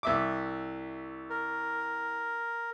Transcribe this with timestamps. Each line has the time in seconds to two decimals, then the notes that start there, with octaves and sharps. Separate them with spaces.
0.03 C2 E5 D6
1.30 A#4